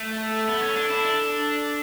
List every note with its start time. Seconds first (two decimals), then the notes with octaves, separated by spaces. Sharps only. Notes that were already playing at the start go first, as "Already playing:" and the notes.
Already playing: A3
0.20 A4
0.48 B3
0.62 C#4
0.77 D4
0.90 E4
1.05 D4